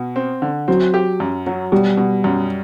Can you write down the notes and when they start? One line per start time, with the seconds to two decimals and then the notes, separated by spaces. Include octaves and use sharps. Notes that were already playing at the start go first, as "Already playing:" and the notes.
Already playing: B2
0.16 C4
0.42 D3
0.68 F#3 C4
0.94 G4
1.20 F#2
1.47 F#3
1.72 B2 G3
1.97 B2
2.24 F#2